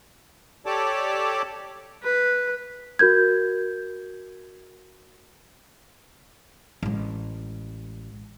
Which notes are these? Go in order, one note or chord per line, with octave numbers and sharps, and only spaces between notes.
G4 A4 C#5 D5 A5 D6
B4
F#4 A#4 G6 G#6
A1 G#3